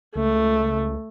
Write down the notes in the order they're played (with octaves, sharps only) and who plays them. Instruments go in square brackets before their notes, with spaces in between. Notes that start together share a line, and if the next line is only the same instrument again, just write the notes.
[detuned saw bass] C#2 [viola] A3